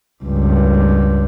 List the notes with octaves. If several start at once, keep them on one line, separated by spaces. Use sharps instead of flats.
C#2 G2